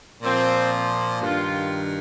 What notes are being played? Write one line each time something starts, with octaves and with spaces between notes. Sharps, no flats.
A#2 F3 C4
G2 D#3 F4